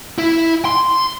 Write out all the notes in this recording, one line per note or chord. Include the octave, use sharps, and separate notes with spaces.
E4
C6